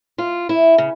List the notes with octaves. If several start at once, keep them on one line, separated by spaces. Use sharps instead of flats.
F4
E4
C#3